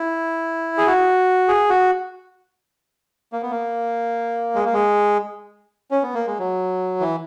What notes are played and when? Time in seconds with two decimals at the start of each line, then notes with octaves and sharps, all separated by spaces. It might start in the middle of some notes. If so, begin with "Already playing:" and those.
Already playing: E4
0.78 G#4
0.87 F#4
1.48 G#4
1.69 F#4
3.33 A#3
3.42 B3
3.51 A#3
4.55 G#3
4.65 A#3
4.73 G#3
5.91 C#4
6.03 B3
6.14 A#3
6.26 G#3
6.39 F#3
7.00 E3